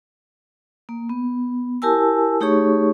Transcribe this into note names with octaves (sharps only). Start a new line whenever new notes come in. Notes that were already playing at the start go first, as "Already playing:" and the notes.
A#3
B3
E4 G4 A#4 G#5 A5 E6
A3 D#4 G4 G#4 C#5 C#6